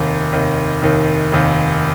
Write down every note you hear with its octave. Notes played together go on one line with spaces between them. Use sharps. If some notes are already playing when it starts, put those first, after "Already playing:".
Already playing: F1 D#2 D#3
F1 D#2 D#3
F1 D#2 D#3
F1 D#2 D#3